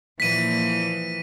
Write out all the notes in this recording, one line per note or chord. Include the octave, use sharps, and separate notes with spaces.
A#2 E3 F3 B6 D#7